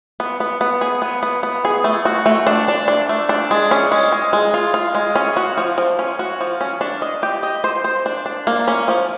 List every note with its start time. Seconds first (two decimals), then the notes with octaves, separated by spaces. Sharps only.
0.20 B3
0.40 B3
0.61 B3
0.81 G#4
1.02 B3
1.23 B3
1.43 B3
1.65 G#4
1.84 A3
2.05 F#4
2.26 A3
2.47 D4
2.68 D4
2.88 D4
3.09 A3
3.29 D4
3.51 G#3
3.71 C#4
3.92 G#3
4.12 G#3
4.33 G#3
4.54 F4
4.74 F4
4.95 G#3
5.16 C#4
5.37 F#4
5.58 F3
5.78 F3
5.99 C#4
6.19 F#4
6.41 F3
6.61 C#4
6.81 D4
7.02 D#5
7.23 G4
7.43 D#5
7.64 C5
7.84 C5
8.06 D4
8.26 D4
8.47 A#3
8.68 C#4
8.88 F3